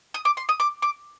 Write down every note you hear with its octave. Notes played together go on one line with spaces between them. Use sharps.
D#6
D6
C6
D#6
D6
D6